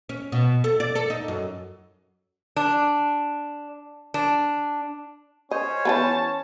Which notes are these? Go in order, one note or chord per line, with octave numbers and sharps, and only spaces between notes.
C#4
B2
A4
D5
A4
D#4
F#2
D4
D4
C#4 C5 C#5 D#5
E3 G#3 B3 A5